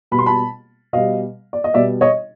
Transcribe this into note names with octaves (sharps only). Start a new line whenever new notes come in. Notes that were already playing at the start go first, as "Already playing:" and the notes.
B2 G3 B5
C6
A5 B5
B2 G3 D#5 F5
D5
D#5
B2 G3 D5 E5
C#5 D#5